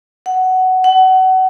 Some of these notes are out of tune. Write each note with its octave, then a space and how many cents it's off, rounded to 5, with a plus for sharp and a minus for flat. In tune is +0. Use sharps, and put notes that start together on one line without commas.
F#5 +10
F#5 +25